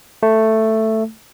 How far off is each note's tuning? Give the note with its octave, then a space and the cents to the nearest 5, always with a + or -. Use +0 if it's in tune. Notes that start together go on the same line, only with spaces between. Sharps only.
A3 +5